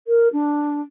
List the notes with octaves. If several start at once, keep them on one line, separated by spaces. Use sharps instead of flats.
A#4
D4